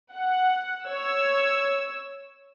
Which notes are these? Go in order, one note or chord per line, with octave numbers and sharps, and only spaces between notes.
F#5
C#5 E6